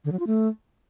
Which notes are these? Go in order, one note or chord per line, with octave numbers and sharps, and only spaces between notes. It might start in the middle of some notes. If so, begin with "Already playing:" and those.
D3
F#3
F4
A3